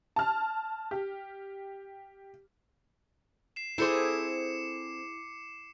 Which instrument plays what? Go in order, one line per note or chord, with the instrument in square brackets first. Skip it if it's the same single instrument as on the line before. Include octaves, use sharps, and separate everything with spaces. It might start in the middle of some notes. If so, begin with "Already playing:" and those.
[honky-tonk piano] A5 F6
G4
[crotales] C7 E7
[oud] C4 A4 C5 [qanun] E4 G#4 [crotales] D6 C#7 E7